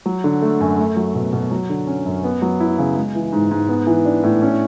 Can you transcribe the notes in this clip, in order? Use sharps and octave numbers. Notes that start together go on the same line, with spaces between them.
F#3
D3
A3
F#2
A3
F#3
B2
B2
F#3
D3
C#4
F#2
B3
F#3
E4
C#3
G#3
E3
G#2
G#2
B3
E3
D4
A2
C#4